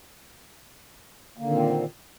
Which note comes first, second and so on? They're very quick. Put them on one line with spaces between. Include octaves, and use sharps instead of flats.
A#3 D3 D#3 A#2 C4